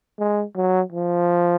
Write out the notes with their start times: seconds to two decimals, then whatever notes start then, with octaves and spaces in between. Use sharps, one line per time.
0.19 G#3
0.56 F#3
0.92 F3